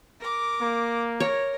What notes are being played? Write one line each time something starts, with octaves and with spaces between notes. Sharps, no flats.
A#4 D6
A#3
A#4 C#5